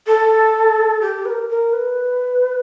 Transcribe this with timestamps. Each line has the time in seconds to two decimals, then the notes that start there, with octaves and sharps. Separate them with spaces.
0.07 A4
1.01 G4
1.25 B4
1.30 A#4
1.50 A#4
1.73 B4